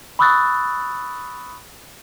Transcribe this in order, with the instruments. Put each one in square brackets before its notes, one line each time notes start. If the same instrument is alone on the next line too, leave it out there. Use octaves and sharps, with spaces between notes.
[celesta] B5 C#6 D#6 E6 F#6 A6